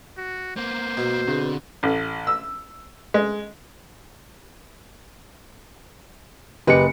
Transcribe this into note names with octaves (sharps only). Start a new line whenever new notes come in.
F#4
A#3 B3 C5
B2
D3 C4 D4 G#4
A1
E6
G#3
F#1 G4 B4 D#5 C#7